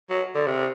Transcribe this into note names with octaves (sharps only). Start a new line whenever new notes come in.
F#3
D3
C3